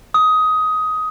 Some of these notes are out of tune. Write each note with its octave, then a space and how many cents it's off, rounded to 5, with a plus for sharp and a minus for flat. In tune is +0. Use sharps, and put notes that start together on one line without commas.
D#6 +15